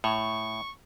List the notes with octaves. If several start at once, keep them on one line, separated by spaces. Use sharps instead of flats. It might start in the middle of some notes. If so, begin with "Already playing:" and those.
A2 C#6